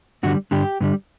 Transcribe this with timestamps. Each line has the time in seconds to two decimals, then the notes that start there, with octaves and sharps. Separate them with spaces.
0.23 G2 D3 G3 F#4
0.51 G2 D3 G3 G4
0.80 G2 D3 G3